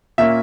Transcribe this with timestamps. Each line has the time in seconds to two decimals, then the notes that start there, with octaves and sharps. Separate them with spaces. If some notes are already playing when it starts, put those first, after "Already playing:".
0.18 A#2 A#3 C#4 E5